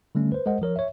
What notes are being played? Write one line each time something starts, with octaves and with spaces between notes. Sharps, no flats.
D3 G3 A3 C#4
B4 C5
G#3 A#4 C5 D#5 F#5
F3 A#4 C#5
C#5 E5